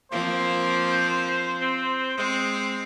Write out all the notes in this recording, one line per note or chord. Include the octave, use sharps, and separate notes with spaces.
F3 A#3 C4 C5
C4
G#3 C4